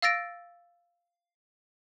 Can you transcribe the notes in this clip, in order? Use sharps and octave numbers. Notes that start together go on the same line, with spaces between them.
F5 E6 A6 A#6 D7